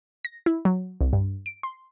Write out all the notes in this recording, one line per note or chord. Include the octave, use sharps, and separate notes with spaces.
A#6
E4
F#3
C2
G2
D7
C6